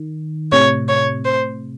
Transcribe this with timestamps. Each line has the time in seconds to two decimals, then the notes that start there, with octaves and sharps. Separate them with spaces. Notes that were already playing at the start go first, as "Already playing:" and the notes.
Already playing: D#3
0.52 A2 C3 C#5
0.88 C#5
1.25 C5